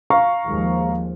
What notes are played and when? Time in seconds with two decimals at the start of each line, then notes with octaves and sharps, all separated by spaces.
0.10 F5 A#5 C#6
0.46 D#2 F3 G#3